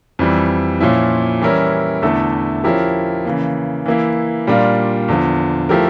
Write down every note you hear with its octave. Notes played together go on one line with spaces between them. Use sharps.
F2 E3 G3
A#2 F3 C#4 E4
E3 G3 C#4 E4 A#4
E2 D3 A3 E4 A4
F3 C#4 E4 G4 A#4
C#3 E3 A#3
E3 A#3 E4
A#2 G3 D4 F4 A#4
E2 D3 F3
F3 A3 E4 G4 A#4